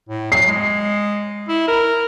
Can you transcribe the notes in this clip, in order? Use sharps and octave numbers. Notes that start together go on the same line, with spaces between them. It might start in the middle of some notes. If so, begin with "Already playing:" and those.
A2
F#3 C7
G#3
E4
A#4